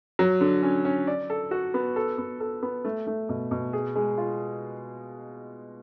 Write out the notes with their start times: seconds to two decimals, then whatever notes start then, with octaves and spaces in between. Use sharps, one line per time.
0.19 F#3
0.41 D3
0.63 C#4
0.85 C#4
1.07 D5
1.30 A4
1.51 F#4
1.74 B3
1.96 A4
2.18 B3
2.40 A4
2.63 B3
2.85 A3
3.07 A3
3.29 B2
3.51 B2
3.73 G#4
3.96 G#3
4.18 F4